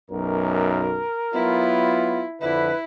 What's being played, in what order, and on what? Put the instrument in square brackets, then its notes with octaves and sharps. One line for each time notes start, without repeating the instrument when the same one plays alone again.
[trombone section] B1 F#2 [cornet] A#4
[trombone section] F#3 B3 F4 [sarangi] E4
[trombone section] F2 D3 [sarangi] E4 [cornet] B4